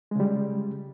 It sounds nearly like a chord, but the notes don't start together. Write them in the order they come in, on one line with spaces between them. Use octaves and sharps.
G#3 C#3 G3